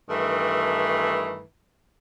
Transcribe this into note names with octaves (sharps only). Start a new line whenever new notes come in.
G2 D#3 E3 A3